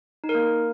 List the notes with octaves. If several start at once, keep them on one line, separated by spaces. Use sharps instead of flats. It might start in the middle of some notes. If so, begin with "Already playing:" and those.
D#4
A#4
A#3